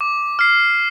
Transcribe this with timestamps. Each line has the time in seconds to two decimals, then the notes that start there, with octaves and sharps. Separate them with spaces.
0.01 D6
0.39 F6 C7